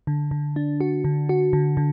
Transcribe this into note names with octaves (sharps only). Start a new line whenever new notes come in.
D3
D3
D4
F#4
D3
F#4
D3
D3